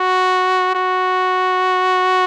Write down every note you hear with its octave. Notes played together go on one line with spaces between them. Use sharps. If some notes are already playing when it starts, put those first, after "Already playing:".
Already playing: F#4
F#4